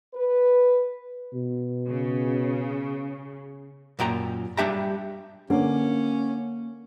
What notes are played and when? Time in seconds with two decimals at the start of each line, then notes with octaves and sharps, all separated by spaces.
0.14 B4
1.34 B2
1.88 C#3
3.99 F#2 A#2 G5 A#5
4.57 G3 D4 G4 E5 G5 A#5
5.50 D3 A#3 C#4